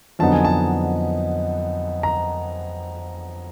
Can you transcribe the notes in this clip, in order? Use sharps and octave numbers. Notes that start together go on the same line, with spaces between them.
F2 D3 F#3 B3 D#4 A5
G#5
A5
A#5